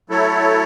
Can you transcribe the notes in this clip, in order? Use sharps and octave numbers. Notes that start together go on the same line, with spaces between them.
F#3 A3 E4 A4 C#5